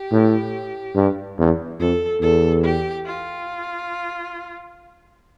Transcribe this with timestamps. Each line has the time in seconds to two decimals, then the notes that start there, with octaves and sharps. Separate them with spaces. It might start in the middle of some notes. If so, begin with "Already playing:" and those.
Already playing: G4
0.12 A2
0.96 G2
1.38 E2
1.80 F2 A4
2.22 E2 A4
2.64 G4
3.06 F4